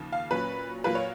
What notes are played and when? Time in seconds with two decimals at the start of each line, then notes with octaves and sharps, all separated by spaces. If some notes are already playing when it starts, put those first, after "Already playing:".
Already playing: D#2 C#3 F3
0.13 F5
0.30 A#2 F#3 C#4 B4
0.84 A#2 F#3 A#3 F4 B4
0.95 C#5